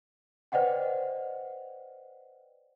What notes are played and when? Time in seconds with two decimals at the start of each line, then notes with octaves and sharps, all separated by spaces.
0.52 B4 C5 D5 D#5 F#5 G5